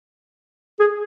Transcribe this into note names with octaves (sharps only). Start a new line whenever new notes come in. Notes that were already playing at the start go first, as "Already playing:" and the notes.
G#4